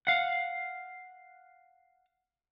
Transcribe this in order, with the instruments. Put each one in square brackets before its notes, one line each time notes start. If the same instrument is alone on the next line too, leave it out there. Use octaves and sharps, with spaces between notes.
[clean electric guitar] F5 F#5